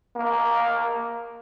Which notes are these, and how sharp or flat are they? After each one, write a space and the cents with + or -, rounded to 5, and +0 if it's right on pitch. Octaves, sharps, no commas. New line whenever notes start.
A#3 +5